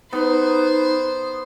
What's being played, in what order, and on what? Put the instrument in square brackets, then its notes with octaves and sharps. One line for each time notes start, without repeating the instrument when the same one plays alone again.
[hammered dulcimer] B3 [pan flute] D#4 [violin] C5